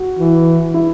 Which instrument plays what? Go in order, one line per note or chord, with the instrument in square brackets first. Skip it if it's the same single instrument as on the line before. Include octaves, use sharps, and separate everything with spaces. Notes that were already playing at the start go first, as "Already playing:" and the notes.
Already playing: [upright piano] F#4
[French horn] E3
[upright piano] E4